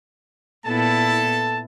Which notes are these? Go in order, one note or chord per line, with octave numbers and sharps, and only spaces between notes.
A#2 B3 E4 A4 A5